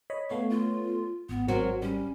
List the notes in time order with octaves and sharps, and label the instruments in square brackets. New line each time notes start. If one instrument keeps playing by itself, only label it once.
[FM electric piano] C#5 D#5 B5
[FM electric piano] A3 B3 C#5 [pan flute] F5
[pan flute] F4
[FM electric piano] G#1 [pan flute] B3
[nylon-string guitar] F#3 C4 F#4 [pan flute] A#4
[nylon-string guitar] G3 [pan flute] C#4